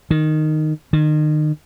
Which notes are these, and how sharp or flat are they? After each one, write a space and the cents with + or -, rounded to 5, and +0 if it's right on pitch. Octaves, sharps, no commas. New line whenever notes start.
D#3 -10
D#3 -35